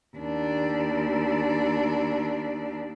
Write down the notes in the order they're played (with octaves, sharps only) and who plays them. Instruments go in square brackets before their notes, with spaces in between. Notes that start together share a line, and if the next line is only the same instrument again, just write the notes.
[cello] D#2 D4